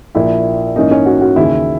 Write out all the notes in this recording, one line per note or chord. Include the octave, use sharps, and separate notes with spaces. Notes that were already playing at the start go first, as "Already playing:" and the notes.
A#1 A#2 A#3 E4 E5
G#2 E3 A#3 C#4 D#4 D#5
C#4 C#5
F#4
F#4
D#2 C#3 E3 E4